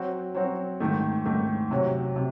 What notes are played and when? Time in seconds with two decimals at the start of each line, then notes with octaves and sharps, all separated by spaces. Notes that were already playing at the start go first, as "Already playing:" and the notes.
Already playing: F#3 C4 F#4
0.34 F#3 C4 F#4
0.80 G#2 D#3 A3
1.25 G#2 D#3 A3
1.71 C3 F#3 C#4 F#4
2.16 C3